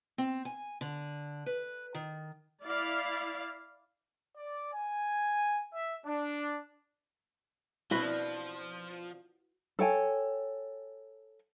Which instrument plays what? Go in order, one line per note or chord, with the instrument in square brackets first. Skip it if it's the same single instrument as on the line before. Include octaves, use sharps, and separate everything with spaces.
[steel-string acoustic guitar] C4
G#5
D3
B4
D#3
[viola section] E4 D5 F5
[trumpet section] D5
G#5
E5
D4
[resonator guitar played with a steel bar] B2 C4 D4 [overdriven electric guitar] F3 [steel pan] E4 [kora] F#4 B4
[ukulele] A4 C#5 G5 G#5